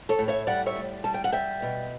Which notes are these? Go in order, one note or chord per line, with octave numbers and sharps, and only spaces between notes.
A4 C#5
A2
C#5 E5
G3 D5 F#5
C#5 E5
A2
G3 A5
G5
F#5
G3 E5 G5
B2